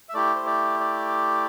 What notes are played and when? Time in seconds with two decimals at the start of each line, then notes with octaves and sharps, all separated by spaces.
0.09 E5
0.13 A3 E4 G4 D5
0.35 C5
0.46 D5
0.80 D5